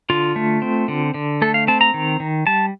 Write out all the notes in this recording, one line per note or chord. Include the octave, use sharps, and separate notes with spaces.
D3 F4
A3
C4
D3
D3
A3 A4
F5
C4 A5
A#5
D#3
D#3
G3 A5